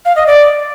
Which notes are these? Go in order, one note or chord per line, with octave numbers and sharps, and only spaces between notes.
F5
D#5
D5